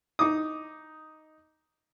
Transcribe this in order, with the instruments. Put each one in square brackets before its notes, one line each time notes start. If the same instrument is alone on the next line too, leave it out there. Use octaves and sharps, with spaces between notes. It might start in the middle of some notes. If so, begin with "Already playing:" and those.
[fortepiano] D#4 D6 D#6